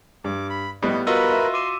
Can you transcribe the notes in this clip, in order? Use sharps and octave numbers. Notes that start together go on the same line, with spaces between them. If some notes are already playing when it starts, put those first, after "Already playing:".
G2 D6
B5
A2 G3 B3 D#5
F4 F#4 A#4 B4 D#5 B5 C6 E6
E5
C6 D6 D#7 E7